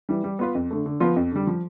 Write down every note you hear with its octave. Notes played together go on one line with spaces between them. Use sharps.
E3 G3
G3
B3 F4 B4
F2
D3 A3
D3
F3 B3 F4
F2
D3 G3
F3